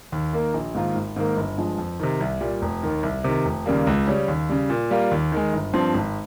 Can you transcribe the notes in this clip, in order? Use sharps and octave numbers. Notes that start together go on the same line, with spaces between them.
D#2
D#3 A#3
A#1
G#2 D#3 A#3 F4
G#1
G#2 D#3 A#3
G1
G2 F3 G#3
F2
C3 D#3
C2
A#2 G3
F1
D#2 D#3
C2
C3 D#3
F1
D#2 C#3 G3 A#3
C#2
C#3 G3 C#4
D#2
C#3 G3
A#2
G3 A#3 F4
D#2
D#3 G#3
G1
G2 F3 C4
G#1